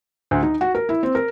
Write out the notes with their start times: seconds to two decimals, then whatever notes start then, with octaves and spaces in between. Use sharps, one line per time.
0.31 D2
0.43 D#4
0.61 F#4
0.75 A#4
0.89 E4
1.03 C4
1.15 A#4